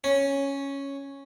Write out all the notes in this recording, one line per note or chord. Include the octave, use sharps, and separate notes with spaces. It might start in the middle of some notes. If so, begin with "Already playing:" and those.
C#4